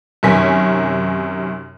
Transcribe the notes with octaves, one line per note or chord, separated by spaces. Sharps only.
F#2 C3 D#3 C#5 G#5 B6